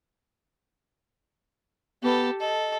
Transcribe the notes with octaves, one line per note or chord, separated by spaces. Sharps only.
B3 G4 A4
A4 D#5